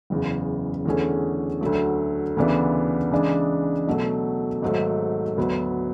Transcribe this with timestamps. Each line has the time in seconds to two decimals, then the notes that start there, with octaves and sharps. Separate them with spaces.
0.10 F#1 E2 C#3
0.86 E2 D3 A3 C#4 G#4
1.61 D2 D3 F#3 A3
2.37 D2 C#3 E3 B3 D4
3.11 C#3 E3 G#3 D4 G#4
3.88 B2 F#3 A3
4.62 G#1 G#2 F#3 A3
5.37 D2 D3 F#3 B3